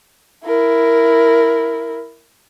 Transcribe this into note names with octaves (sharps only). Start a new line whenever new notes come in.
E4 A#4